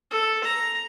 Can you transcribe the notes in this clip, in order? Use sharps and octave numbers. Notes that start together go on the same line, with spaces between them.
A4
A#5